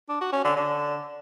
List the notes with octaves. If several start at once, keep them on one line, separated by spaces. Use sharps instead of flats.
D4
F#4
C#4
D3
D3